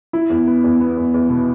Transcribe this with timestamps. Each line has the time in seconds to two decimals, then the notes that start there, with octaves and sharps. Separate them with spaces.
0.13 E4
0.30 E2
0.48 B3
0.64 E2
0.81 B3
0.97 E2
1.14 E2
1.29 B2